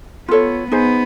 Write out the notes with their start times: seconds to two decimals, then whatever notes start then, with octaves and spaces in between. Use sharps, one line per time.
0.28 B3 F4 A4 C#5
0.72 B3 D#4 G#4 C5